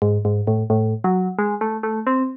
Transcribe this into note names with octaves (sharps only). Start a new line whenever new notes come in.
G#2
G#2
A2
A2
F#3
G#3
A3
A3
C4